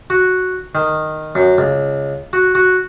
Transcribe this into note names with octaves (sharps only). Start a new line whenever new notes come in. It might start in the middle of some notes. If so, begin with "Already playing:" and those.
F#4
D#3
F#2
C#2
F#4
F#4